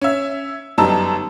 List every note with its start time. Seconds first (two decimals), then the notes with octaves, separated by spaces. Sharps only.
0.02 C#4 E5
0.78 G1 F#2 G3 D#4 A5 E6